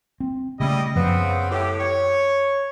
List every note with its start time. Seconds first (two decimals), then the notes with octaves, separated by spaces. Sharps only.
0.20 C4
0.60 C#3 G3 A3 C#4 E4 D#5
0.96 F#2 C#3 F3 B3 C4
1.50 A2 G4
1.79 C#5